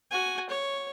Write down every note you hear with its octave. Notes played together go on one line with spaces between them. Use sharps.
F#4 G#5
C#5